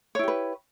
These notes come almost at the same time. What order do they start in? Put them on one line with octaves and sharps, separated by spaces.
C#5 E4 G4 B4